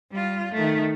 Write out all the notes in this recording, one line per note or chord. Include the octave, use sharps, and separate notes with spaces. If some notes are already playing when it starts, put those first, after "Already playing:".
G3 F4
D#3 A3